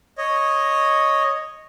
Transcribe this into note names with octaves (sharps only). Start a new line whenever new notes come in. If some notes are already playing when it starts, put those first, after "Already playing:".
C#5 D#5